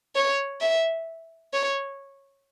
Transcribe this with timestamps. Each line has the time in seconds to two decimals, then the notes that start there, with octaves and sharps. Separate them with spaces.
0.15 C#5
0.61 E5
1.53 C#5